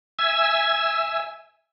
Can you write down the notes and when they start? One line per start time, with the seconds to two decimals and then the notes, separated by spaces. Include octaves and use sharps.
0.19 E5 G#5 E6